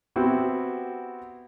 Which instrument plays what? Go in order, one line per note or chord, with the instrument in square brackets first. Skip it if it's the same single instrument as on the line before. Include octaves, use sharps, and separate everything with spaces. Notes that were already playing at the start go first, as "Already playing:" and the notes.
[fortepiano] B3 C4 E4 F#4 G4